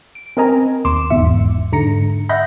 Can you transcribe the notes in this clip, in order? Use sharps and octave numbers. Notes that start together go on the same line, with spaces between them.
D7
C4 A#4 D#5 G#5 A#5
D#2 C6 D6 E7
G1 E2 G#2 E5 C#7
G#2 D3 A#5 A#6 C#7
D#5 E5 F#5 B5 G6 A#6